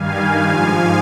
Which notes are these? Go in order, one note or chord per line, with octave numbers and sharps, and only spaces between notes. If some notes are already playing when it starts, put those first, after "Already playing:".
Already playing: G2 D#3 G3 F5 G#5
G#2 F3